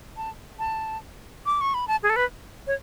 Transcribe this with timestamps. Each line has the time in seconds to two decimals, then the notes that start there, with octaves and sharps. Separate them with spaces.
0.17 A5
0.59 A5
1.46 D6
1.61 C#6
1.74 B5
1.88 A5
2.03 G#4
2.10 A4
2.16 B4
2.67 C#5